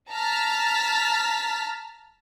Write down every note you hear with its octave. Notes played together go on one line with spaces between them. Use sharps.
A5 A#5 F6 A6 B6